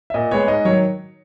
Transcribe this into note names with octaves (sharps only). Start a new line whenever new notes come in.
E5
A#2 D#5
G#3 B3 C#5
G#2 D#5
D#3 F#3 C#5